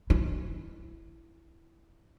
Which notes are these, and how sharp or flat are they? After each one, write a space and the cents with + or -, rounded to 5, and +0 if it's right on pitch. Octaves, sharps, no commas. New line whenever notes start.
E4 +10